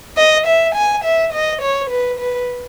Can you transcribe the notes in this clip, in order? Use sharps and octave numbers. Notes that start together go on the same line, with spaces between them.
D#5
E5
G#5
E5
D#5
C#5
B4
B4